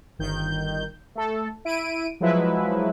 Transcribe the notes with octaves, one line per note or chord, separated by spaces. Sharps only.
G1 D#3 G6
A3 A4
E4 D7 D#7
F3 F#3 G#3 E4 B4 E5